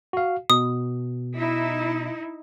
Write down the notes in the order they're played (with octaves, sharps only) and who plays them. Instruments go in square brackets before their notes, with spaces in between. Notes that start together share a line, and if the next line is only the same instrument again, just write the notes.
[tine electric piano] F#4 F5
[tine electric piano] B2 [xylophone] D#6
[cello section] D#4 E4